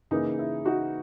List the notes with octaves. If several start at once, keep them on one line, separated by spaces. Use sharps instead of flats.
C#3 E3 A#3 D#4
E4
D#4 F#4